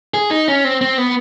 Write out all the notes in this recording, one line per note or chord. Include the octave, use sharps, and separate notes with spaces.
G#4
D#4
C#4
C4
C4
B3